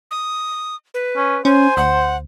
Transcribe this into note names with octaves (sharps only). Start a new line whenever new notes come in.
D#6
B4
C#4
C#4 C5 G#5
D2 F#5